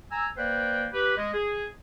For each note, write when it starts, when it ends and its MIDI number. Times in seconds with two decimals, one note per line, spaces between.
0.11 0.27 80
0.11 0.27 82
0.11 0.27 88
0.37 0.87 58
0.37 0.87 71
0.37 0.87 72
0.37 0.87 74
0.37 0.87 79
0.93 1.14 67
0.93 1.14 71
1.17 1.29 56
1.17 1.29 75
1.33 1.65 68